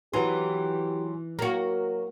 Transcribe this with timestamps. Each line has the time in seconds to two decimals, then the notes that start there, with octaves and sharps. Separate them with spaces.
0.14 E3 F#3 D#4 G4 B4 G#5 C6
1.39 F#3 A#3 F#4 A#4